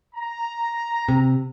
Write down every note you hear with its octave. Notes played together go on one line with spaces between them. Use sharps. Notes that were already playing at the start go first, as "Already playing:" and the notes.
A#5
C3